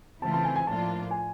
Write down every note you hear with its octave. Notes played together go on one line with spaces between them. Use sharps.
C#3 E3 A3 C4 F4 A5
A5
G#5
G#5
A2 F3 A#3 D4 F4 A5
G#5